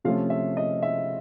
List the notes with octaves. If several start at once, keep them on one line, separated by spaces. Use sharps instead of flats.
C3 F3 A3 C#4 F4 F5
E5
D#5
E5